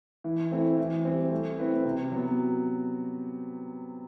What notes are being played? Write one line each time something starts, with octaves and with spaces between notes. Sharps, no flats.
E3
A3 C4 E4
E3
G3 C4
A3
C4 E4 B4
C3
F#3 B3